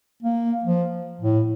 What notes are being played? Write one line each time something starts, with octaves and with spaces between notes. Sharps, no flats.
A#3
F3
A2